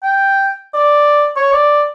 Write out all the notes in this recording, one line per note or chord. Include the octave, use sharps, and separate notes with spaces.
G5
D5
C#5
D5